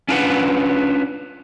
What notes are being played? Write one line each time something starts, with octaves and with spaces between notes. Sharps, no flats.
C#4 D4 F4 B4 F#5